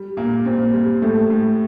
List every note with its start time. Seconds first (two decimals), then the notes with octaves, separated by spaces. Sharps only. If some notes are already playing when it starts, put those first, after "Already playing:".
Already playing: G3
0.17 A#2 A#3
0.45 A#2 C4
0.73 G3
1.02 A2 A3
1.30 A2